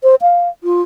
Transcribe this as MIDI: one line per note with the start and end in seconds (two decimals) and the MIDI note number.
0.03 0.15 72
0.22 0.49 77
0.64 0.82 65